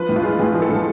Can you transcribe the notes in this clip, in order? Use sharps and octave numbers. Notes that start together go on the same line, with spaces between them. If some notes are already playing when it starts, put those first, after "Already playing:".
Already playing: F3 B4
A2
F4
G#3
A2 G#4
F3
A4
A2